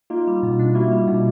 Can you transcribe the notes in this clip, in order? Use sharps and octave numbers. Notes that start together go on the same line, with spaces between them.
A#3 D#4 F4
G3
B2
D4
A#3 E4 F#4
G3
B2 D4